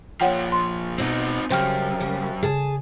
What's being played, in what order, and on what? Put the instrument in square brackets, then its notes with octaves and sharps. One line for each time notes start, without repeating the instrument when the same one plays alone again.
[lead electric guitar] A#2 F3 [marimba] C#5 F#5 G5
[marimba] C6
[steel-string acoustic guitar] B2 B3 [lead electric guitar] C4 D#4
[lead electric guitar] F#2 [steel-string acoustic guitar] C#3 G3 [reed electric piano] C5 G5 F6
[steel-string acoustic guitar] C#3 G3 A#3
[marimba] C#3 [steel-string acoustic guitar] G#4 G#5 A5